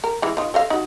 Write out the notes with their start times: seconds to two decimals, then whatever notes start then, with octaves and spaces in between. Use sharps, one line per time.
0.04 A#4
0.22 E3 G#3
0.37 D#3 F4
0.54 A4 D#5 F5
0.70 D#4 F#4